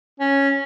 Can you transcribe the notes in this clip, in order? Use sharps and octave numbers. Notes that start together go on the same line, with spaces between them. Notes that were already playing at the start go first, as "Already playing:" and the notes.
C#4